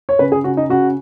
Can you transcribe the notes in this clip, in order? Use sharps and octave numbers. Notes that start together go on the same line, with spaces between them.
C#5
C#3 B4
G#4
C#3 F#4
D#4
C#3 F#4